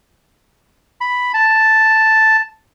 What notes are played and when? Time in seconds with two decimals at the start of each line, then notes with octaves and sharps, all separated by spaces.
1.01 B5
1.34 A5